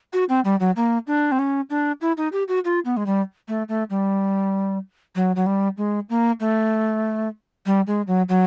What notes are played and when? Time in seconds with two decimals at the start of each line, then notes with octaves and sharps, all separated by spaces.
0.13 F#4
0.29 C4
0.45 G3
0.60 F#3
0.76 A#3
1.07 D4
1.32 C4
1.39 C#4
1.70 D4
2.01 E4
2.17 D#4
2.32 G4
2.48 F#4
2.65 F4
2.85 B3
2.97 G#3
3.06 G3
3.48 A3
3.69 A3
3.90 G3
5.15 F#3
5.36 F#3
5.46 G3
5.77 G#3
6.09 A#3
6.40 A3
7.66 G3
7.87 G#3
8.07 F#3
8.29 F#3